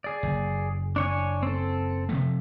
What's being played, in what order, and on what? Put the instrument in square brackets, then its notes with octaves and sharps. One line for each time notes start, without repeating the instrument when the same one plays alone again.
[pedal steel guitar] G#4 D5
[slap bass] F#1
[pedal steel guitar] D4 C#5 G#5
C4 A4
[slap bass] C3 F3 A3